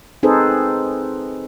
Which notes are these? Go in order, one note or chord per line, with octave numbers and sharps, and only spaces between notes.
C4 D#4 G#4 A4 B4 C5